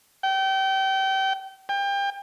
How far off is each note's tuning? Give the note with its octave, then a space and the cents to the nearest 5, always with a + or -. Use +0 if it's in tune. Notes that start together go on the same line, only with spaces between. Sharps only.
G5 -30
G5 +30